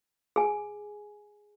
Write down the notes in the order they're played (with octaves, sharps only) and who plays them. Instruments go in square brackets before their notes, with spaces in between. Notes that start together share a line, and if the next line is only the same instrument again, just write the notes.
[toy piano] G#4 G#5